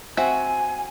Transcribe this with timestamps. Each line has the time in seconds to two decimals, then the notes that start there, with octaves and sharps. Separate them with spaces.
0.17 C4 F#4 E5 G#5